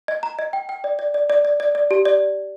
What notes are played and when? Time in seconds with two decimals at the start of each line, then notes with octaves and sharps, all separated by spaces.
0.08 D#5
0.23 A#5
0.39 D#5
0.53 G5
0.69 G5
0.84 D5
0.99 D5
1.14 D5
1.30 D5
1.45 D5
1.60 D5
1.75 D5
1.91 G4
2.05 D5